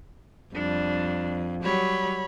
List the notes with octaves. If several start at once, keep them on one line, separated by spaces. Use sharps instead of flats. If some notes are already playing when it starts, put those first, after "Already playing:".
F2 G3 D4
F#3 G3 C#5 B5